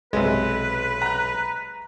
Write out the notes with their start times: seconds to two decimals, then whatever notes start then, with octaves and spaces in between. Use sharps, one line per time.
0.13 B1 C3 G#3 B4
1.02 A#5 F#6